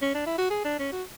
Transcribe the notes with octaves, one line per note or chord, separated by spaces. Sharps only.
C#4
D4
E4
F#4
G#4
D4
C#4
F#4